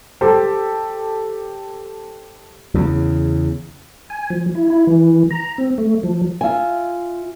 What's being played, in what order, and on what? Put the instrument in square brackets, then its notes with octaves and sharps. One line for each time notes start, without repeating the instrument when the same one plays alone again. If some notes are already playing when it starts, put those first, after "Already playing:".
[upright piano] G4 A4 C5
[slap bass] E2 C#3
[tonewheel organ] G#5
F3
E4
E4
E3
A#5
C4
A3
F3
[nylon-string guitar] F4 E5 G#5